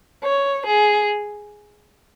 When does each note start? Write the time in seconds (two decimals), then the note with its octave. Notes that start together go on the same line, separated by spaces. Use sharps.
0.24 C#5
0.66 G#4